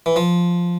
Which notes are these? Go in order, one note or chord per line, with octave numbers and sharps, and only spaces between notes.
E3
F3